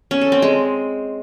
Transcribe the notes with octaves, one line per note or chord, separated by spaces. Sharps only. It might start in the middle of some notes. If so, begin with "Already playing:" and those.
C#4
A4
C4
G#3